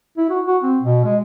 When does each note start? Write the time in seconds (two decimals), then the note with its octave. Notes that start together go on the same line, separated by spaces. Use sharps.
0.18 E4
0.30 F#4
0.47 F#4
0.63 C4
0.81 B2
1.05 G#3